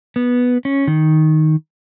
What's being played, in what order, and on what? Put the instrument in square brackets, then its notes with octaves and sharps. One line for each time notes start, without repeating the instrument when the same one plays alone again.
[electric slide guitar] B3
C#4
D#3